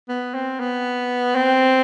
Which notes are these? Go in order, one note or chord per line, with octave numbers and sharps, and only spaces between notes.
B3
C4
B3
C4